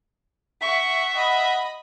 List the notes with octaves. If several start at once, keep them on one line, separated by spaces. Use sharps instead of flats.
E5 F#5 C#6
D#5 F#5 B5